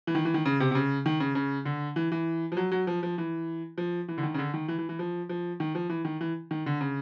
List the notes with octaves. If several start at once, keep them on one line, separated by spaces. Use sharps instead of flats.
E3
D#3
E3
D#3
C#3
C3
C3
C#3
D#3
C#3
C#3
D3
E3
E3
F3
F#3
F#3
F3
F3
E3
F3
E3
D3
D#3
C#3
D3
D#3
E3
E3
E3
F3
F3
D#3
F3
E3
D#3
E3
D#3
D3
C#3